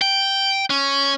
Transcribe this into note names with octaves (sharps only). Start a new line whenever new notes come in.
G5
C#4